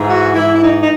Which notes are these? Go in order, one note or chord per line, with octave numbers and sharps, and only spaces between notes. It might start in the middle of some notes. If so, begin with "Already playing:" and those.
Already playing: G#2 E3
F#4
G#2 E3 E4
E4
D#4
D#4